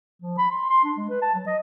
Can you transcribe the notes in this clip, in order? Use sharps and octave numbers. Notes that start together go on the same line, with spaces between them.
F3
B5
C6
C6
D4
G#3
B4
A5
F#3
D#5